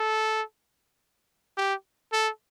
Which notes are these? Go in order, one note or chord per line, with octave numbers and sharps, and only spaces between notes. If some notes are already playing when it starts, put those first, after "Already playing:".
Already playing: A4
G4
A4